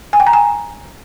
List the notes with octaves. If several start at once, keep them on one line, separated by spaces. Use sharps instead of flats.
G#5
G5
A#5
G#5